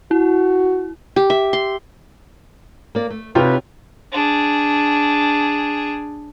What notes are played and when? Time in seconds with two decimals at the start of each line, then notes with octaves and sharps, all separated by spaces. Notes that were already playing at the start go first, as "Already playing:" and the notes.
0.11 E4 F#4
1.16 G4
1.30 E5
1.53 C6
2.95 A#3 D5
3.10 A3
3.35 C3 D#4 F4 F#4 B4 C#5 G5
4.12 D4 G#4